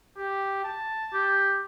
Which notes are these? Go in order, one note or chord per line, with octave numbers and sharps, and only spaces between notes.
G4
A5
G4